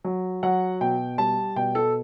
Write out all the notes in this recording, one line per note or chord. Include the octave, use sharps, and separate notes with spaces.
F#3
F#3 F#5
B2 G5
G3 A5
B2 G5
A4